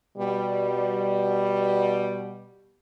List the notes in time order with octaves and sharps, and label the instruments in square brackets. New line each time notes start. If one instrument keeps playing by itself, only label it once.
[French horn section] B2 G3